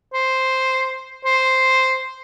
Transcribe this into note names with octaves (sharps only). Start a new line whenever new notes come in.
C5
C5